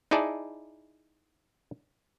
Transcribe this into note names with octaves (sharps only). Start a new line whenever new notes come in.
D#4 E4 G#4 D5 A5